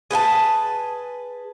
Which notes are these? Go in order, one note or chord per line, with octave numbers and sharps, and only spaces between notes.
G#4 B4 G5 A5